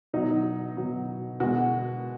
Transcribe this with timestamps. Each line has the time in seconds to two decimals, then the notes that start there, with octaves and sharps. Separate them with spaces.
0.13 B2 F#3 D#4
0.77 B2 F#3
1.40 B2 G#3 F#4